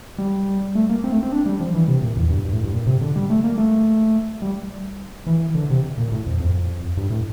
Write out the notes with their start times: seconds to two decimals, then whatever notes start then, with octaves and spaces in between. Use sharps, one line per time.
0.18 G3
0.75 A3
0.89 A#3
1.04 C4
1.12 A3
1.23 C4
1.32 D4
1.46 G3
1.60 F3
1.75 E3
1.88 C3
2.02 A#2
2.16 E2
2.30 G2
2.45 G2
2.53 A2
2.64 G2
2.73 A#2
2.86 C3
3.01 D3
3.16 G3
3.30 A3
3.44 A#3
3.58 A3
4.42 G3
5.27 E3
5.55 D3
5.70 C3
5.98 A#2
6.12 A2
6.26 F2
6.40 F2
6.97 G2
7.10 A2